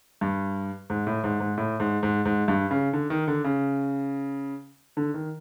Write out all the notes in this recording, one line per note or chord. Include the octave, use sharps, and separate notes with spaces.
G2
G#2
A2
G#2
G#2
A2
G#2
G#2
G#2
G2
C#3
D3
D#3
D3
C#3
D3
D#3